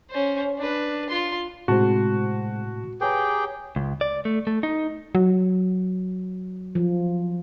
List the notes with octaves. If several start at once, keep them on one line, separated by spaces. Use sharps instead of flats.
C#4 C5
D4 B4
F4 C6
A2 C3 G#3 F#4 C5 A5
G4 G#4 B4 C#5 G5 A#5
C#2
D5
A3
A3
D#4
F#3
F3